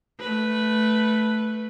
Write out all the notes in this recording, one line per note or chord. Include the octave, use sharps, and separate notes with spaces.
A3 B4